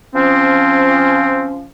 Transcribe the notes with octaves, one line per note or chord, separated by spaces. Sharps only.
F3 C4 C#4